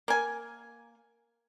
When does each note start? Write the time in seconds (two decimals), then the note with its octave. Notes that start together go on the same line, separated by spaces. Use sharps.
0.08 A#3 G#5